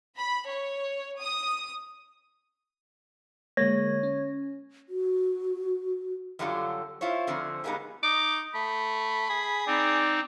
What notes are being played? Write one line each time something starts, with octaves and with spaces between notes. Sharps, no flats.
B5
C#5
D#6
D3 G#3 A#3 C#5 A#6
C#4
F#4
F#2 D3 F#3 G3 F4 A4
E4 F4 C5 C#5
D3 F3 C4 C#4
G3 G#3 A#3 B3 D#4
D#4 D6
A3 B5
G#4
C4 D#4 D5